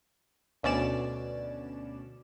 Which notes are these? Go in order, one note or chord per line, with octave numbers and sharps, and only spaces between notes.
D2 B2 C#4 D5 E7